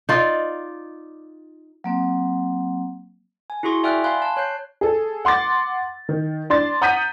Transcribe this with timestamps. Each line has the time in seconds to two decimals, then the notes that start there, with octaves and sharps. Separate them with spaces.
0.09 D#4 F4 D5
1.84 F#3 A#3 C4
3.50 G#5
3.63 E4 F#4 G#4 C6 C#6
3.83 D5 E5 G5 G#5 F6 F#6
4.04 F5 G#5 B5 C6 F#6
4.22 A5
4.37 C#5 F#6 G6 C7
4.81 G#4 A4
5.25 F#5 C6 D6 A6
6.09 D#3
6.50 D4 C6 A6
6.82 F#5 A#5 D#6 G6 B6 D#7